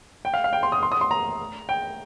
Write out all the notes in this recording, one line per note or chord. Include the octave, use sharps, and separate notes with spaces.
G5
F5
F5
G5
C6
D#6
C6
D#6
C6
A#5
G5